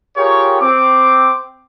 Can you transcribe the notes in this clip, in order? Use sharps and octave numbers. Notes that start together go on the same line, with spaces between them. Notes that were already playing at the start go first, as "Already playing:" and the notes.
F4 G4 G#4 A#4 C#5 G5
C4 D6